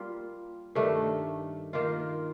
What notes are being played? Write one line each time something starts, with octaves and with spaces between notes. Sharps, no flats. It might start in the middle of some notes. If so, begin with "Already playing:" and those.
Already playing: G3 A#3 F4
G2 D#3 A3 D4
D#3 A#3 F4